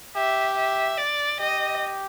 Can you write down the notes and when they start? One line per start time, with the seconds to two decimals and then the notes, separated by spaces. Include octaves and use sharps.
0.15 G4 E5
0.57 E5
0.98 D5
1.39 G4 D#5